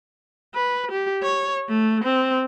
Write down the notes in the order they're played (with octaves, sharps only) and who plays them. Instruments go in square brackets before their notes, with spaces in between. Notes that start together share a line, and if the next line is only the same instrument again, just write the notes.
[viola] B4
G4
C#5
A3
C4